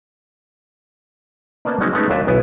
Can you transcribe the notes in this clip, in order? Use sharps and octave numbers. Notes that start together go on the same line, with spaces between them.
A#3 B3 C#4 D5 D#5 A5
G#3 C4 C#4 D#4 F#4
G#3 A3 B3 C#4 D#4
D#2 F#3 D4 E5 G#5
B1 B3 E4 G#5